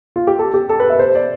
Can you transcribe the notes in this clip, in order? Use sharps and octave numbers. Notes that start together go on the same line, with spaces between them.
F4
G4
A4
G4
A4
B4
E5
C5
D5